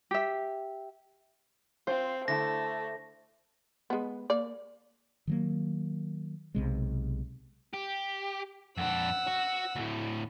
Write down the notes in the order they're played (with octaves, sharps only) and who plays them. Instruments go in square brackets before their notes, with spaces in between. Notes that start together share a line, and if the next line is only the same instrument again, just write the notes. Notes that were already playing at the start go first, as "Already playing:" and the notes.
[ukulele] G4 E5
[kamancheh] C4 [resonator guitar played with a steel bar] F4 [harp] C5
[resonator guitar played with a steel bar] D3 E4 [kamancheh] A3 [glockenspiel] A#6
[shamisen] G#3 B3
A#3 D5
[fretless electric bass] D#3 F#3 A#3
B1 C3 G#3
[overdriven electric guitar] G4
[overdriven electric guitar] F2 D4 [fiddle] F#5 E6
[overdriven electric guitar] F#4
D2 A2